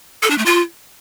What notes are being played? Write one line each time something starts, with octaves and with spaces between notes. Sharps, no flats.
A4
D4
A3
F4